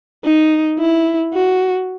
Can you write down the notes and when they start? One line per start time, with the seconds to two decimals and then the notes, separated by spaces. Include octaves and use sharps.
0.24 D#4
0.79 E4
1.33 F#4